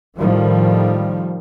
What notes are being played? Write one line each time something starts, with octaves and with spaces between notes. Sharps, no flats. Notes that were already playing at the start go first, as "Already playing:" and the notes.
A2 D#3 F3 G3